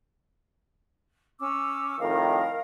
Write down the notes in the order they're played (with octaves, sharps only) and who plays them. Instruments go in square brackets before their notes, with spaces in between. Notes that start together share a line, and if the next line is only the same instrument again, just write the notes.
[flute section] C#4 D6 E6
[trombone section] F2 A2 D#3 [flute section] A#4 F5